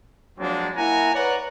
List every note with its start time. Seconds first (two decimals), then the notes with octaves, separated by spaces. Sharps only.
0.39 F3 F#3 G#3 A#3 C4 D4
0.75 A#3 E4 F#5 G#5 A#5
1.14 B4 C#5 D5 F#5 A#5